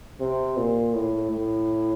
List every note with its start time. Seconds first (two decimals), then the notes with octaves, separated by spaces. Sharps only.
0.20 C3
0.57 A#2
0.95 A2
1.31 A2